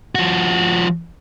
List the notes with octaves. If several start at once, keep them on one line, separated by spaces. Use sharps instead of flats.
F3 F#4